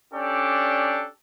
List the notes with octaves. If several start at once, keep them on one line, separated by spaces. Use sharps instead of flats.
C#4 D4 G4 A4 D5